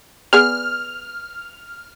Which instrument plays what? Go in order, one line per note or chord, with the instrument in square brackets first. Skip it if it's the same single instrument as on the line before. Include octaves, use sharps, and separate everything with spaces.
[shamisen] B3 G#4 D5 [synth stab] F6